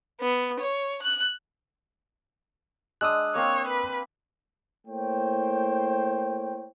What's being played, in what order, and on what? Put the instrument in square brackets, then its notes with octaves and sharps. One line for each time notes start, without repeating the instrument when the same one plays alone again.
[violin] B3
C#5
F#6
[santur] G#3 D4 [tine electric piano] D#6 E6 F#6
[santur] A#3 C4 F5 [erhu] C#5
[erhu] B4
[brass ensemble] A3 A#3 E4 C5 C#5 G5